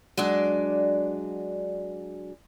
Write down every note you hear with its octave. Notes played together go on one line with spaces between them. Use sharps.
F#3 G#3 D4 D5